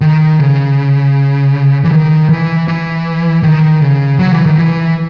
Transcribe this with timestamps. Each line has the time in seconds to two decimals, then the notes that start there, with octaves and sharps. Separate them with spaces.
0.01 D#3
0.40 C#3
1.84 E3
1.91 D#3
2.29 E3
2.68 E3
3.43 D#3
3.82 C#3
4.19 F#3
4.32 E3
4.46 D#3
4.58 E3